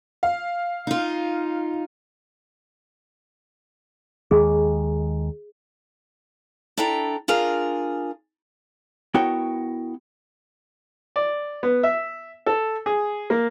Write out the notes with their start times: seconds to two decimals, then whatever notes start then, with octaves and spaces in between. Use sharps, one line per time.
0.23 F5
0.87 D#4 F4
4.31 D#2 D#3 G#3 G#4
6.77 D4 E4 A4 G5 A#5
7.28 D4 F4 G#4 A#4
9.14 B3 E4 F#4 A#4 C#5 G5
11.16 D5
11.63 B3
11.83 E5
12.46 A4
12.86 G#4
13.30 A#3